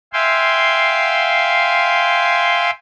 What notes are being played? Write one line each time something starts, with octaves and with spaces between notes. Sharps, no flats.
E5 F5 G5 G#5 C6